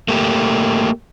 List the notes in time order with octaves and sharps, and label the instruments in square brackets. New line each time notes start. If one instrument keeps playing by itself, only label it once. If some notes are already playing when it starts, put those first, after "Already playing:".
[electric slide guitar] A3 A#3 G4